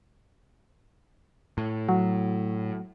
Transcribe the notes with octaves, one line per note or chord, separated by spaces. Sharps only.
A2
F#3